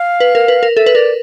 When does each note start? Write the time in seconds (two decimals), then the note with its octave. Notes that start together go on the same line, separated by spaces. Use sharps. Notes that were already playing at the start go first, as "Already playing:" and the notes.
Already playing: F5
0.20 B4
0.35 A#4
0.48 B4
0.63 A#4
0.77 A4 E5
0.86 B4
0.95 A#4 D5